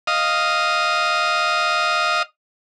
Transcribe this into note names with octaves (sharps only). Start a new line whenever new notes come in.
D#5 F5